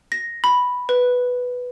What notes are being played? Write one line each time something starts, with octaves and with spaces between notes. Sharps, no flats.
A#6
B5
B4